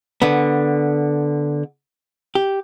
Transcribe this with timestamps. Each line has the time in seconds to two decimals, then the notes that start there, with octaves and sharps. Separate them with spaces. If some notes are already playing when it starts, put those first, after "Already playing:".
0.22 D3 B3
2.35 G4